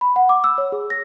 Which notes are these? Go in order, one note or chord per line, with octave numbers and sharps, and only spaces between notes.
B5
F#5
D6
E6
C#5
G#4
A#6